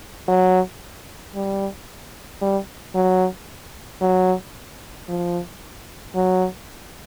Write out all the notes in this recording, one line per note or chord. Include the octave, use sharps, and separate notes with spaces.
F#3
G3
G3
F#3
F#3
F3
F#3